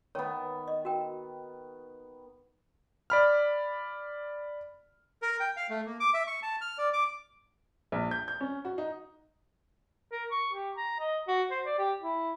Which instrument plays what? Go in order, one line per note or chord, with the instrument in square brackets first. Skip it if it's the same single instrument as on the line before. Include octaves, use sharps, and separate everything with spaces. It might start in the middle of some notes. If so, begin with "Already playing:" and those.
[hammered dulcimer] D#3 B3 [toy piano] C#5
[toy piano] D#5
F#4 A#4 G5
[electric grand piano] D5 B5 F6
[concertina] A#4
G5
F5
A3
A#3
D6
E5
C#6
A5
F6
D5
D6
[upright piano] A#1
G6
G6
C#4
F#4
D#4
[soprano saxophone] A#4
C#6
G4
A#5
D#5
F#4
C5
D5
G4
E4